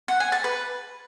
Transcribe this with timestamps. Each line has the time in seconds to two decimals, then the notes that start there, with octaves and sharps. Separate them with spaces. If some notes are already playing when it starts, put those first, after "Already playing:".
0.08 F#5
0.20 G#5
0.32 A5
0.44 B4